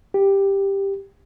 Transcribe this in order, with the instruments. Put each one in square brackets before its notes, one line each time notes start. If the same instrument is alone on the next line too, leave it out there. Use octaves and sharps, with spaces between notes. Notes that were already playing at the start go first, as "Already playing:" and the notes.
[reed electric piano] G4